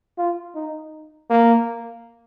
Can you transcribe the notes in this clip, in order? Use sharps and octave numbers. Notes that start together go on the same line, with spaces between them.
F4
D#4
A#3